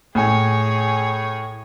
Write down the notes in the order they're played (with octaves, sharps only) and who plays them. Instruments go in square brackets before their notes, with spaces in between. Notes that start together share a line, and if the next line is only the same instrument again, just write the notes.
[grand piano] A2 G#5 [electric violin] G#4 C#5